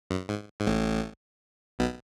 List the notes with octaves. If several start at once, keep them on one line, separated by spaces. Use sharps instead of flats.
F#2
G#2
G#2
A1 A2
B1 B2